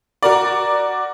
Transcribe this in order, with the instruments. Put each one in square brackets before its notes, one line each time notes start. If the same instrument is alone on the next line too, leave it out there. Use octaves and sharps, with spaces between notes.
[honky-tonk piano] F#4 A#4 D5